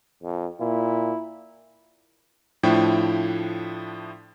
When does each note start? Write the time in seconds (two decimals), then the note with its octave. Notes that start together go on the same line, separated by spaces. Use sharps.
0.23 F2
0.61 A#2 E4
2.63 A2 F3 D4 E4 G5